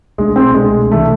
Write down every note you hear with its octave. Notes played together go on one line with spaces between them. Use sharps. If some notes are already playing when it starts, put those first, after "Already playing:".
C2 B2 G#3 A3 D4
C4
C2 B2 G#3 A3 D4
C3 E3 A3